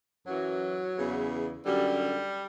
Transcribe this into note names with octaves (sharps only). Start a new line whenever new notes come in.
F#2 E3 F#3
E2 C#3 E3
F#2 D3 G3